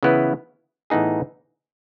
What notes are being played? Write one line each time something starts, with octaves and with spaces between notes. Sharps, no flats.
C#3 E3 B3 E4 B4
A2 E3 B3 D#4 G#4